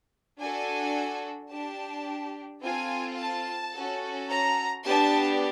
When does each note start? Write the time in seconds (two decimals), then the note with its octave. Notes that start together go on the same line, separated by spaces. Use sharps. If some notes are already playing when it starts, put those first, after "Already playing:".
0.40 D4 F#4 A4 G#5
1.51 D4 G4 A5
2.63 C4 F4 A4 G#5
3.19 A5
3.75 C#4 F#4 A4
4.31 A#5
4.86 B3 D4 G4 A5